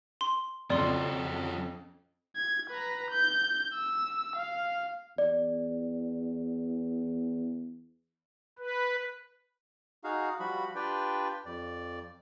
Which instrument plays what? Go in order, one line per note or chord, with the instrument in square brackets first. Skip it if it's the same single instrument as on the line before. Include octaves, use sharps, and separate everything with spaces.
[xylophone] C6
[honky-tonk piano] F2 C#3 [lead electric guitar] F3 F#3 [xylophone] D5 C6 G7
[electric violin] G#6
B4 A#5
G6
E6
F5
[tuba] E2 [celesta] D5
[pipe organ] B4
[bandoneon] D#4 F#4 G#4 F5
F3 G3 F#4 B5
D4 F4 G4 B4 D5 G5
F2 D5